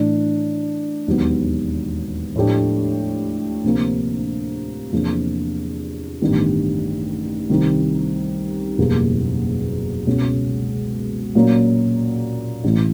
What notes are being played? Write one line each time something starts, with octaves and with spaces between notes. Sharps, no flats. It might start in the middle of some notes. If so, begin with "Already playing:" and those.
Already playing: A2 E3 A3 D4
E1 D#2 D#3 F#3 B3
A2 F3 A3 D4 G4
D2 C3 F3 A#3
E2 C3 F3 A#3 D4
A1 G2 D#3 G3 B3
C2 C3 D#3
F#1 E2 B2 G3 A#3
C#2 B2 G#3 C#4
A#2 F#3 A#3 C#4
A1 A2 E3